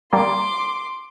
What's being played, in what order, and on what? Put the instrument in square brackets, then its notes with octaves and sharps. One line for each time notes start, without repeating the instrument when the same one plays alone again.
[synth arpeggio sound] G3 A#3 [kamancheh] C6 D6